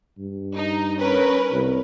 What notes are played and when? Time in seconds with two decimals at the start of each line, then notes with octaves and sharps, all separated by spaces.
0.18 G2
0.56 D#4
1.00 C#4 A#4 B4
1.52 C2